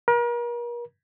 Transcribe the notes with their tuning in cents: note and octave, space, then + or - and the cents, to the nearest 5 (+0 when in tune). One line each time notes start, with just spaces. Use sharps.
A#4 +40